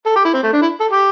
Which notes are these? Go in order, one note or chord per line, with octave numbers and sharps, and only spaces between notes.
A4
G4
E4
C4
A3
D4
E4
A4
G4